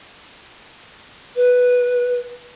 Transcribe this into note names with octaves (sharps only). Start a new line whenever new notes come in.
B4